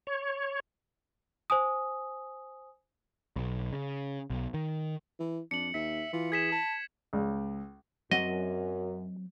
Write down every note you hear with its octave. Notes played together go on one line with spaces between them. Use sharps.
C#5
C5 G#5 D#6
B1
C#3
B1
D#3
E3
F2 D4 C#7 F#7
D#2 E5 B6
E3 F4
G#4 G#6 B6 E7
A5
C#2
F#2 F#3 C4 D#5 F#5